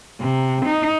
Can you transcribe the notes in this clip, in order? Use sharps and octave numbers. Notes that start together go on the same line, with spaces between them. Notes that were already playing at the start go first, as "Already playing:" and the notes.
C3
D#4